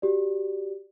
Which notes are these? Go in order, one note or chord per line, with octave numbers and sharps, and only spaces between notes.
F#4 G4 D5